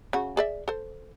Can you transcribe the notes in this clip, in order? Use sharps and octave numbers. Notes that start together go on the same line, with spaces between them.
C#3 F#4
G#4 D5 E5
A4 C5